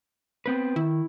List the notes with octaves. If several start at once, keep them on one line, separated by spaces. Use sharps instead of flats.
B3 C4 B4
D#3 E4